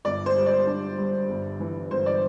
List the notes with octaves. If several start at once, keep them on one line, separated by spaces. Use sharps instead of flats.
G1 D5
C5
G3
D5
D4
G2
G1
E3
G1 C5
D5